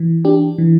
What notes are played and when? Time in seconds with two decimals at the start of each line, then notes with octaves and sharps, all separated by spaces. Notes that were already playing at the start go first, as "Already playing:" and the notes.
Already playing: E3
0.25 D4 G4
0.58 E3